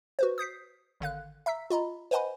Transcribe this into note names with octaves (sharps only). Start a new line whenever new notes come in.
F#4 B4 C5
D#6 G6 B6 C7
G#1 D3 F5 F#6
E5 A#5 E6 B6
F4 D#5 A#5 B5
B4 C5 D#5 F#5 G#5 B5